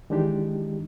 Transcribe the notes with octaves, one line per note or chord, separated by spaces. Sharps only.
D#3 E3 G#3 D4 D#4 G4